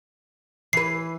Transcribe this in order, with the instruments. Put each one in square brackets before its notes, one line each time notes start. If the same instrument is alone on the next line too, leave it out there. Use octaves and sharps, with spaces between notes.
[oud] E3 B4 [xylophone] C7